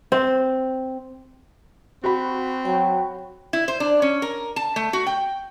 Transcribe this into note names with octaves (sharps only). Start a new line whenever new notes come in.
C4
C4 F#4 B5
F#3 G5
E4
C5
D4
C#4
A#4
A5
A3
F#4
G5